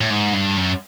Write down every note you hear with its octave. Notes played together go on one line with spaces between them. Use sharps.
A2
G#2
G2
F#2